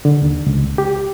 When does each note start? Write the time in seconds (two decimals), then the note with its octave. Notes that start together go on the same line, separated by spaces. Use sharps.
0.05 D3
0.22 D#2
0.46 C#2
0.78 G4